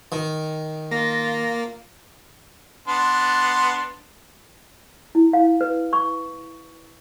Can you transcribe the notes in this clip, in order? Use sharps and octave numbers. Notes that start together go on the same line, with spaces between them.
D#3
A#3 F4 A#6
B3 D4 C6
E4
F5
B4
C#6